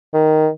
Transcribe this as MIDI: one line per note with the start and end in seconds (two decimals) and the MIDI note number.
0.14 0.49 51